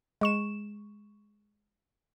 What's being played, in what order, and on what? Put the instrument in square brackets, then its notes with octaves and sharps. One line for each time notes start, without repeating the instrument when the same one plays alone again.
[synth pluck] G#3 C#6 E7